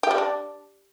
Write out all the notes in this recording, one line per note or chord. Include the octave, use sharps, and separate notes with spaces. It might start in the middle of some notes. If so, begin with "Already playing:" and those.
G4
G3
D4